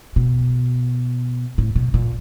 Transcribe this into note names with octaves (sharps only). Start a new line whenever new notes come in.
B2
A2
B2
A#2